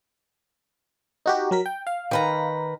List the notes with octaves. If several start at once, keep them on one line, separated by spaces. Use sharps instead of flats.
D#4 F#4 G4
F#3 A#4 B6
G5
F5
D#3 B4 A#5